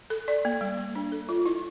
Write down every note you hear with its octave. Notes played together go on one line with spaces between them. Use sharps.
A4
D5
A#3
G3
A#3
D4
A4
F4
E4